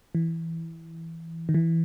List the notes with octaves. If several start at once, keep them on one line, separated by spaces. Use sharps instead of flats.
E3
D#3
E3